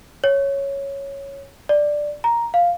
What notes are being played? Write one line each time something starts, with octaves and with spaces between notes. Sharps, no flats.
C#5
D5
A#5
F5